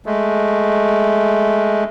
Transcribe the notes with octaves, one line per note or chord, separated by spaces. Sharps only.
G#3 A3